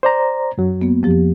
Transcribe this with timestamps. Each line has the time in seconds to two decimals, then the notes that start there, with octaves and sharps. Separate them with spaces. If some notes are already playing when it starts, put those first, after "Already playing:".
0.03 C5 D5 A#5
0.58 F#2 F#3
0.82 A#3 B3
1.03 F2 F3 G4